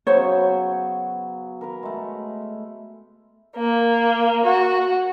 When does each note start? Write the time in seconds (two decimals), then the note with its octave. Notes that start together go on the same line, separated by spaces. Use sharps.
0.07 C#3 F#3 B3 C5 C#5
1.61 A#4 B4 A#5
1.83 G#3 A3
3.56 A#3
4.45 F#4